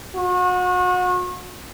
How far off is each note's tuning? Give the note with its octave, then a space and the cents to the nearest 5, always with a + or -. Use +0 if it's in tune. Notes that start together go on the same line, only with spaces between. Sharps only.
F#4 -35